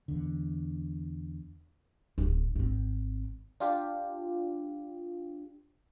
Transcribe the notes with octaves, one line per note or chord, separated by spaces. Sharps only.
E2 D3
D1
G#1 C4
D4 F4 G4